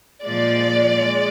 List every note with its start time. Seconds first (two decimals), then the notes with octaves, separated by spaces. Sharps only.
0.25 A#2 F3 G#3 D5
1.00 G#3